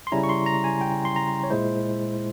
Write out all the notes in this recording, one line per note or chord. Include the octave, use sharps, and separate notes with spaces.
C6
C#3 G3 C#4 E4 A#5
C#6
C6
A#5
G#5
G5
C6
A#5
C#5
A#2 G#3 E4 C5